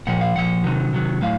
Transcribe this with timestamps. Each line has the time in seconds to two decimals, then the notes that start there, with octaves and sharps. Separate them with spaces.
0.07 A#2 F3 F#5
0.21 F5
0.36 A#2 F3 F#5
0.64 C3 D#3 F#3
0.93 C3 D#3 F#3
1.22 A2 F#3 F5